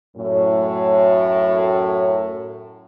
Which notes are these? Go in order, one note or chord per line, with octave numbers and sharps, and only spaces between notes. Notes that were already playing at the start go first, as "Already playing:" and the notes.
F#2 A2